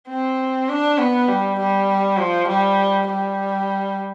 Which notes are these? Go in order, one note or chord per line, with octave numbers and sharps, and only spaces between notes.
C4
D4
B3
G3
G3
F3
G3
G3